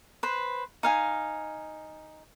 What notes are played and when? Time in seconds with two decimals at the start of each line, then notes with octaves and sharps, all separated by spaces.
0.23 B4 C5
0.83 D#4 F5 G#5